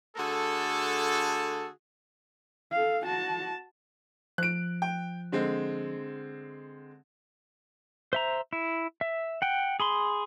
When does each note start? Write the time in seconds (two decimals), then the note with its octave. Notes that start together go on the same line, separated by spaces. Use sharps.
0.17 D3 A3 F#4 G#4 A4
2.72 A4 F5
3.05 F#4 A5
4.38 F3 F#6 D7
4.82 G5
5.32 D3 G#3 C4
8.13 C5 E5 A#5
8.53 E4
9.01 E5
9.42 F#5 G5
9.80 G#4 B5 C6